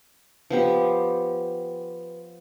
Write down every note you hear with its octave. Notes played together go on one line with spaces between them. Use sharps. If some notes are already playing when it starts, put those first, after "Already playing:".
F3 B3 G4